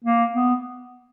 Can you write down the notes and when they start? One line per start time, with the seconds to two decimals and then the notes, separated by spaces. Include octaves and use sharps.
0.04 A#3
0.34 B3